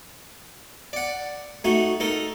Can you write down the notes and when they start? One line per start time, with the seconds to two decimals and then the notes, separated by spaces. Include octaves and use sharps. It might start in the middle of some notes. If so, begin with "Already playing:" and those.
0.93 D5 F#5
1.64 A3 D#4 F#4
2.00 D#4 A4 A#4